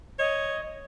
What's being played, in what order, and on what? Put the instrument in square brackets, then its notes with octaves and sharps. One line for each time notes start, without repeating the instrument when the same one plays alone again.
[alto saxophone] C#5 [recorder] D#5